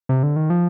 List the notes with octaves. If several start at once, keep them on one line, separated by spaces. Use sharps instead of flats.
C3
D3
D#3
F3